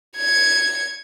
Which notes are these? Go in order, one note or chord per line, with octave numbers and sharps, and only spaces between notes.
G#6 C#7